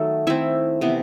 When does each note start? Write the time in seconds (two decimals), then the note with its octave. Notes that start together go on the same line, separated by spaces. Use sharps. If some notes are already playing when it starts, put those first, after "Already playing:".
Already playing: D#3 F#3 A3 A4
0.27 D#3 A3 C4 E4 E5
0.81 C3 E3 B3